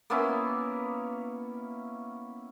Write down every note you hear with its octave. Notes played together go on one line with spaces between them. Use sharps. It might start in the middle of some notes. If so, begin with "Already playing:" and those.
A#3 B3 C#4 E4